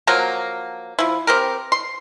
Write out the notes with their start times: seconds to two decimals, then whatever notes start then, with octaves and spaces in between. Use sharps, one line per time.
0.07 F3 F#3 A#3
0.99 F3 E4
1.27 C4 G4 A#4
1.72 C6